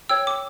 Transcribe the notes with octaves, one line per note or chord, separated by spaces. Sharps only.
C#5 G5 E6
D6